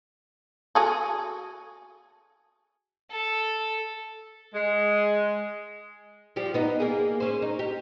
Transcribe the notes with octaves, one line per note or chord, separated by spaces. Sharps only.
F#4 G#4 A4
A4
G#3
F3 G3 G4
B3 D#4
A#3 G#4
C#4 C5
D#4
G4